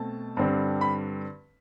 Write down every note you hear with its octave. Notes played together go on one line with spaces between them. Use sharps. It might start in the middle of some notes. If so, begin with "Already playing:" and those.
Already playing: B2 A3 C4 A5
G2 D3 G3 C4
B5